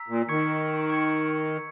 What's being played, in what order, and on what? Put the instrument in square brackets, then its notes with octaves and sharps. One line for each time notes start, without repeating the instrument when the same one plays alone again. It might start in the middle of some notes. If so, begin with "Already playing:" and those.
Already playing: [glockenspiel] A#5 E6 B6
[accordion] A#2
[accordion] D#3 [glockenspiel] C#6 G#6 C#7
[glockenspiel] C#6 G#6 C#7